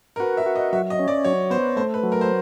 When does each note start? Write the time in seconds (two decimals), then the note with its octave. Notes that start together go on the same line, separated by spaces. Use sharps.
0.16 A#4
0.20 F#4 B4
0.37 E5
0.46 F#4
0.56 D#5
0.73 F#3 E5
0.90 D#5
0.99 C#4
1.08 D5
1.24 F#3 C#5
1.50 B3 C5
1.76 A3 C5
1.94 B4
2.03 F#3
2.12 A#4
2.21 C5